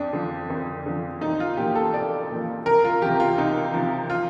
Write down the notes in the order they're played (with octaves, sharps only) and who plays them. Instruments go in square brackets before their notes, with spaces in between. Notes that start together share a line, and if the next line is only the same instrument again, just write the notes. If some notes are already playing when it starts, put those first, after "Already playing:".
Already playing: [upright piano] F2 D4
D3 F3
F2
D3 F3
C2 D#4
F4
A#2 F3 G4
A4
C2 D5
A#2 F3
C2 A#4
F4
C3 F3 G4
F4
C2 D#4
C3 F3
F4